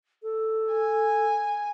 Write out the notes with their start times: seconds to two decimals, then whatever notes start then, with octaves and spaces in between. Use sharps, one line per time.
0.23 A4
0.72 G#5